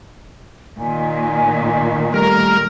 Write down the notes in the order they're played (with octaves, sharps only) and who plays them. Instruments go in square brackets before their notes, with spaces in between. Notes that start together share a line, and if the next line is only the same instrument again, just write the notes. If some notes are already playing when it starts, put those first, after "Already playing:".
[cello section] A#2 D#3 [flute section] G#5
[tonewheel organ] G3 A3 F6 [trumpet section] A#4